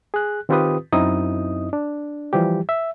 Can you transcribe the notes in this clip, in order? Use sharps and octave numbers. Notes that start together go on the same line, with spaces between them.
G#4 F#6
D#3 C4 F4 G4 B4 D#6
F#2 C4 D#4 E4 D#5 D#6
D4
E3 F3 G3 G4
E5